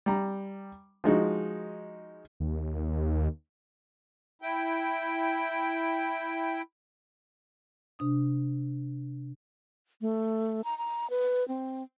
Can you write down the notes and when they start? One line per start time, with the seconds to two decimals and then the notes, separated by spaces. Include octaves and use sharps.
0.06 G3 A#5
1.04 F3 G#3 D#4 F#4
2.40 D#2
4.42 E4 G5
7.99 C3 D4 D#6
10.01 A3
10.64 A#5
10.78 A#5
11.10 B4
11.48 C4